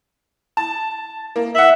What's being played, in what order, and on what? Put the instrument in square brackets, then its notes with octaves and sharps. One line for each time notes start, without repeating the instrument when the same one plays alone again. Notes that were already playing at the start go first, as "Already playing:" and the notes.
[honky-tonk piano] A5
A#3
[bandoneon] E5 [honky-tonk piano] F#5 F#7